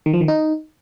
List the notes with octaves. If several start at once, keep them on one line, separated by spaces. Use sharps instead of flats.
D#3
F3
D#3
D#4